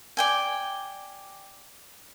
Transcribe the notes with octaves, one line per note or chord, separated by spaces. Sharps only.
D5 G5 G#5